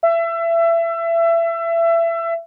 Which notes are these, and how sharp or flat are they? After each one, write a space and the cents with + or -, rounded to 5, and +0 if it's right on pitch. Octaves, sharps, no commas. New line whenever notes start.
E5 +25